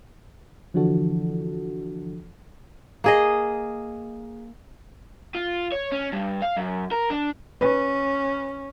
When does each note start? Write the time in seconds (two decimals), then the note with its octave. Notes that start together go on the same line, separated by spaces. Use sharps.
0.74 D3 E3 F3 D4 F#4 A4
3.04 A#3 G#4 D#5
5.35 F4
5.72 C#5
5.92 C#4
6.13 G2
6.42 F5
6.57 F#2
6.92 A#4
7.10 D4
7.61 C#4 B4